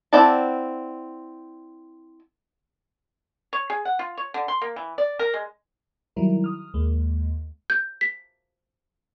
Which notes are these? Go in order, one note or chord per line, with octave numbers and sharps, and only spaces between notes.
C4 E4 D5 F#5 A5
C#5
G#4
F#5
F4
C#5
D3
C6
A#3
E3
D5
A#4
G#3
D#3 F#3 G3 E4 A#4
D#6 F6
D#2 G#3 A#3
G6
B6